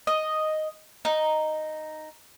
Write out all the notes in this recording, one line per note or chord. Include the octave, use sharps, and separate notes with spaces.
D#5
D#4